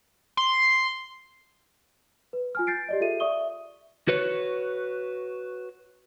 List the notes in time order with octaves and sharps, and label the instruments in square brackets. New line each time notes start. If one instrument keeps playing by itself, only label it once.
[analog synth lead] C6
[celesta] B4
F4 G#5 F6
G6 A6 C7 D7
G4 D5 D#5
F4 G#4 A4 E5 D#7
D5 E5 C#6 D#6 G7
[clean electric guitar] F#4 B4 C#5